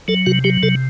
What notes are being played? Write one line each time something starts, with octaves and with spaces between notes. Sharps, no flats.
F#3 A4
C3 F#4
F#3 G4
C3 A4